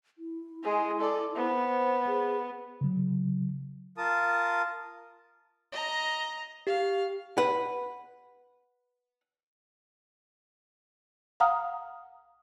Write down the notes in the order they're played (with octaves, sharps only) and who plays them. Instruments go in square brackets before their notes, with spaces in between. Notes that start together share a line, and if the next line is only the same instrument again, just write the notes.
[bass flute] E4
[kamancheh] G#3 G#4
A4 D5
[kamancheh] B3 [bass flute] C5
[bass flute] G#4
[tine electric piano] C#3 F#3
[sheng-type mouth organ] F4 A#4 A5 D#6
[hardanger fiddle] D#5 A#5
[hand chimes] G4 [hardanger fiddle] F5
[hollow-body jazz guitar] B4 F#5
[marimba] F5 F#5 A#5 D#6 F6